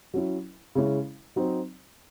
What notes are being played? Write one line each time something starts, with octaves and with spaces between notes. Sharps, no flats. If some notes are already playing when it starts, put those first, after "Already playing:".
F#3 C#4 E4
C#3 G#3 C#4 E4
F#3 C4 D#4